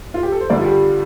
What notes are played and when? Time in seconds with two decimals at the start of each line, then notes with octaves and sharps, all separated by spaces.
0.14 F4
0.23 G4
0.32 A4
0.41 C5
0.50 G2 D3 G3 D5
0.58 F4
0.66 G4